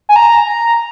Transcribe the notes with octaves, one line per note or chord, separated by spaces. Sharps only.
G#5
A#5